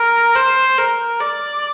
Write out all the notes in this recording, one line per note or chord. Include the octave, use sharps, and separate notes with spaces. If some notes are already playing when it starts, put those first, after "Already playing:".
Already playing: A#4
C5
A#4
D5